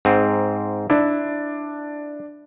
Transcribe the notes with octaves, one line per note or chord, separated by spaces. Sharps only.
G#2 C4
D4 E4